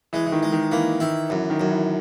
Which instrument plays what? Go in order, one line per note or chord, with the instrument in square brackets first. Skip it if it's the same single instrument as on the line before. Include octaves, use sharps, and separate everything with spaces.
[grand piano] E3 [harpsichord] G#3
[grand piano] E3
D#3
[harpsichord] G#3
[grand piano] D#3
[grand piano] E3 [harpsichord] A#3
[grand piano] D#3 [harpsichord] E4
[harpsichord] F#2 [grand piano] E3
[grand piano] D#3
[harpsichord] F#2
[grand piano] E3